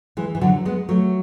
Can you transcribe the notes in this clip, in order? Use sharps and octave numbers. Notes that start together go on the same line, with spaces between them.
E3 G#3
E3
D3 F#3
G#3 B3
F#3 A3